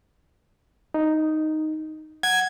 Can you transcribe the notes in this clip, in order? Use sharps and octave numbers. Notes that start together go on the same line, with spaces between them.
D#4
F#5 G#6